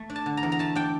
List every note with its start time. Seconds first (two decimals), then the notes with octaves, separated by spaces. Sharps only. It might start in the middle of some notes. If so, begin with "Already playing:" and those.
Already playing: A3
0.10 D4
0.16 A5
0.26 D3
0.37 A#5
0.43 E2
0.52 A#5
0.59 A3 A5
0.75 D4 G5